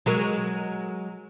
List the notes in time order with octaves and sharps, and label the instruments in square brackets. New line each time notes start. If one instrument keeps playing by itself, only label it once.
[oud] F#3 G#3 A#4